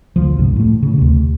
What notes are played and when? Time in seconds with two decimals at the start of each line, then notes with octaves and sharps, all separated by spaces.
0.16 D2 F3
0.39 C#2 G2 C3
0.56 A2 A3
0.83 C#3
0.98 D2 C3